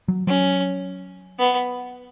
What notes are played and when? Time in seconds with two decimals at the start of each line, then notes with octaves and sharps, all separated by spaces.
0.08 F#3
0.27 F#3 C#4
1.39 B3